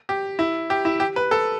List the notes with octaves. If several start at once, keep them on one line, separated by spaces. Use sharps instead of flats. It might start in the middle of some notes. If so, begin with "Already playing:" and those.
G4
E4
G4
E4
G4
B4
A4